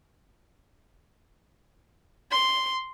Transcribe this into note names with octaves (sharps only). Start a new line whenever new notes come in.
C6